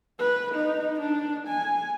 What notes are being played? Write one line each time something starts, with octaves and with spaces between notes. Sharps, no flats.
B4
D#4
D4
G#5